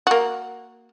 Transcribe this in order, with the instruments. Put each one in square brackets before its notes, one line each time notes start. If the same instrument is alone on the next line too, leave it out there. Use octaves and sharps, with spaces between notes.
[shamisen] A#3 F#4